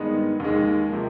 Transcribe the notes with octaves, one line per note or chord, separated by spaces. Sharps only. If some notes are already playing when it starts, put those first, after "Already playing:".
Already playing: G2 D#3 G#3 B3 D#4
D#2 D#3 G#3
C3 F3 A#3